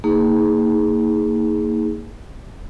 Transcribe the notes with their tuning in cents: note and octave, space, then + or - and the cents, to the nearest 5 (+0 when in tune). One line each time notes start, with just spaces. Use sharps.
A#3 -25 D#4 +30 G#4 +0